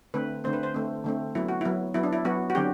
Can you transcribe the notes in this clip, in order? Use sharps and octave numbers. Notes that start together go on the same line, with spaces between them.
D3 A3 C4 B4
D3 A3 C4 C5
B4
C5
D3 A3 C4
D3 A3 C4
F#3 B3 E4
F#4
F#3 B3 E4
F#3 B3 E4
D4
E4
F#3 B3 F#4
F#4
D3 F#3 C4 G4